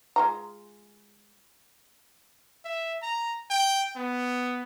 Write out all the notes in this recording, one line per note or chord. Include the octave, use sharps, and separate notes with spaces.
G#3 F4 A#5
E5
A#5
G5
B3